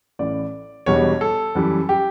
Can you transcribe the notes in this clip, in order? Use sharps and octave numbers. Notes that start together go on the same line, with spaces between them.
A1 A2 E3 D5
E1 E2 B2 G3 C#5
A4
F#2 E3 G3
G4